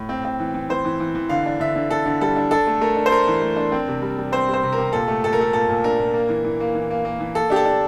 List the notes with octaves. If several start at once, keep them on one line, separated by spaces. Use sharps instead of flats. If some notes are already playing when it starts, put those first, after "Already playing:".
Already playing: A2
C4
C4
E3
E3
E3 C5
E3
E3
E3
D3 F5
D4
D3 E5
D3
D3 A4
D3
G3 A4
D4
D4 A4
A3
A3 A#4
D4
C5
A3 A#4
E3
A3
D4
C4
C3
G3
G3
C4 C5
G3
C5
C3
A#4
C3
A#2 A4
A3
A#2 A4
A#4
A3 A4
A#2 A4
A#2
D4 A#4
A#2
A#3
E3
E3
A#3
E3
A#3
A#3
E3
A#3 A4
D4 G4
A4
D4